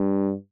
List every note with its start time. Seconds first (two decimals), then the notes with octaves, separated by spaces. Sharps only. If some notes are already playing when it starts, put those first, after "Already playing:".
Already playing: G2